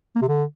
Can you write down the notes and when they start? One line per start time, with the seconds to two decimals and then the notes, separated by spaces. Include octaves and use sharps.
0.16 A#3
0.22 C3
0.28 D3